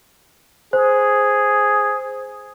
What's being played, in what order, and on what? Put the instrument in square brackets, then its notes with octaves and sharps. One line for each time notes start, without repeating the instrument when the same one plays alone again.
[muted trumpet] G#4 [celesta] C5